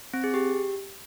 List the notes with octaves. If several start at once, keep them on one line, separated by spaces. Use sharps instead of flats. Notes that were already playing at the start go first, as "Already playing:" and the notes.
C4
G#4
G4